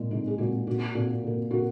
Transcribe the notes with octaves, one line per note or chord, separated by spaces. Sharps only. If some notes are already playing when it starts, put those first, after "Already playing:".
Already playing: A#2 G#3
A#2 G#3 D#4
G#4
A#2 G#3 F#4
A#2 A#3 F#4
A#2 A#3 F#4
A#2 A#3
A#2 A#3 F#4